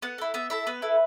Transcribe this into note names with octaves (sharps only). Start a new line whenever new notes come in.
B3 F#5
E4 A4
B3 E5
E4 A4 E5
B3 B4
E4 A4